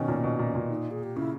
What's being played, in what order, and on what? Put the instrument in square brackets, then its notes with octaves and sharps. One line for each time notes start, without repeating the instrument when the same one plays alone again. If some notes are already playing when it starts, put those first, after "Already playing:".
Already playing: [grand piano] B2 D#3 [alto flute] C#4
[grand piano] A#2
B2
A#2
A#2
[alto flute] D#4
G#4
G4
[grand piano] C#3 [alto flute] E4